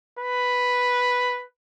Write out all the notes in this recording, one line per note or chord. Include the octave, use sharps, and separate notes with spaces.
B4